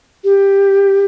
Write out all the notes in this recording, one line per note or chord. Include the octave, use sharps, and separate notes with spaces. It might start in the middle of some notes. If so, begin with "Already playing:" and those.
G4